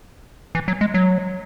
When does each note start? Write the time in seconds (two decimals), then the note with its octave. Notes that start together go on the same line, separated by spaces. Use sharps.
0.55 E3
0.68 F#3
0.81 G#3
0.94 F#3